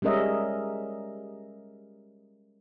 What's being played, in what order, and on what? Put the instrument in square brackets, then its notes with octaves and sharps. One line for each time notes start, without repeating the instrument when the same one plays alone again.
[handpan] G3 G#3 C#4 A#4 D#5 E5